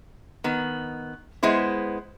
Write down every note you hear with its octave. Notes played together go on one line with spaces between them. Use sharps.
D#3 B3
G#3 B3 E4 C5